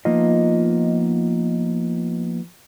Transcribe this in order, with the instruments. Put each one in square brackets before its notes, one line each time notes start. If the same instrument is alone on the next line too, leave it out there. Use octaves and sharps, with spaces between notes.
[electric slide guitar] F3 A#3 B3 D#4 F4 D#5